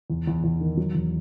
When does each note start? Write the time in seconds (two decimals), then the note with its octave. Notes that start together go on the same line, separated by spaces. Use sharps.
0.10 E2
0.27 E2
0.44 E2
0.61 D#3
0.77 F#3
0.95 E2